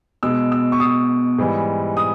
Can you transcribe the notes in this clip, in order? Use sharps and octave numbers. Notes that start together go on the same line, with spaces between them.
B2 G#3 E6
E6
C#6
D#6
G#2 E3 G3
D#6